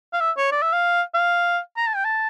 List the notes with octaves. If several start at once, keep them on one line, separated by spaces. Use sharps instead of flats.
F5
E5
C#5
D5
E5
F5
F5
A#5
A5
G5
A5